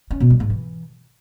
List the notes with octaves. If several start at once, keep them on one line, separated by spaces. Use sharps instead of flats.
C#4
B2
G3
G#2
E3